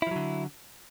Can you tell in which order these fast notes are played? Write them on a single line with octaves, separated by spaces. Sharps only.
E4 F3 F#3 D3